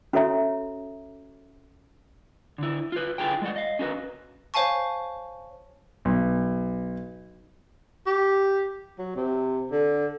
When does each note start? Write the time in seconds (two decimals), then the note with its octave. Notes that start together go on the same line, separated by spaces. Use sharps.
0.13 C#4 F#4 A4 C#5 E5 A#5
2.58 D3 E4
2.92 F4 B4
3.18 D3 E4 F4 G#4 B4 G5
3.42 G#3 D5 F#5
3.56 D#5 F5
3.79 C#4 F#4 G4 A#4 B4
4.54 C5 C#5 F5 G#5 A5 C#6
6.05 B1
8.06 G4
8.98 F#3
9.15 C3
9.71 D3